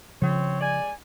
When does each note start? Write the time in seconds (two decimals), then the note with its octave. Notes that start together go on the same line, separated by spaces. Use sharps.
0.22 C#3 F3 C4 C#5
0.61 G#3 D5 G#5